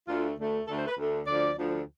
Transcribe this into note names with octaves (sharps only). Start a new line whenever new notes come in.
D2 D3 A3 F4
D2 D3 A3
D2 D3 A3 A4
C5
B4
D2 D3 A3
D2 D3 F3 D5
D2 D3 F3